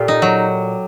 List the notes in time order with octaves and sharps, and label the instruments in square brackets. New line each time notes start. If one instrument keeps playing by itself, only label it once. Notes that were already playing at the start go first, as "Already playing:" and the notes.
Already playing: [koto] A#2 F4 [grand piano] G4 A4
[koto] D#4
F#3